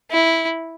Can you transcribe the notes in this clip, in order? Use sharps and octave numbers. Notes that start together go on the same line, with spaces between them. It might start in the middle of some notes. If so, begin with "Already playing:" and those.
E4